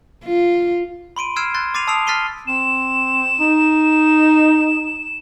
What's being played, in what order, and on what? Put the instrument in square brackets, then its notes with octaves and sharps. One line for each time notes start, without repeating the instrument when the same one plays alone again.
[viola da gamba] F4
[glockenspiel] B5 C6 D7 D#7
E6 F6 G#6 C7 D7 E7
C6 F#6 A6
D6 A6 C7 D#7 F7
A5 D#6 E6 C7 D7 F7
F6 A6 B6 C7 D#7 G7
[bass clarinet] C4 [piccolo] E7
[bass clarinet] D#4